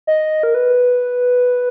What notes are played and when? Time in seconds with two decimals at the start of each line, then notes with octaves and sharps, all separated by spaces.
0.07 D#5
0.43 A#4
0.54 B4